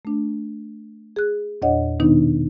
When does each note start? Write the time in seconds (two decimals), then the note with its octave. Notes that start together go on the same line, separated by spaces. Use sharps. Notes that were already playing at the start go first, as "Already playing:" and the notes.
0.05 A3 D4
1.16 G#4 F#6
1.62 E2 A#2 D4 C#5 D#5 F#5
2.00 B2 D#3 B3 D4 D#4